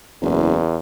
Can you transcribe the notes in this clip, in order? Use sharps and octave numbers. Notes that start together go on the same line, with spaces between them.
F#1 E2